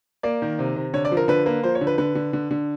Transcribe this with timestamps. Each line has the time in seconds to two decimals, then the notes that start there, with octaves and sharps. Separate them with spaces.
0.23 A#3 D5
0.42 D#3
0.59 C3
0.76 C3
0.93 D3 C#5
1.05 D5
1.11 F3
1.17 A#4
1.28 D3 B4
1.46 A#3 B4
1.64 F3 C5
1.75 C#5
1.81 D3
1.87 B4
1.98 D3 B4
2.15 D3
2.33 D3
2.51 D3